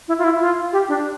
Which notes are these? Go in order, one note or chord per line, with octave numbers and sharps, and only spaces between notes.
E4
F4
E4
F4
G4
D4